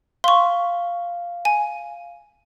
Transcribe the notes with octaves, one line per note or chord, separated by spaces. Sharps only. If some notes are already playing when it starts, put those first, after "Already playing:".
F5 C6 C#6
G#5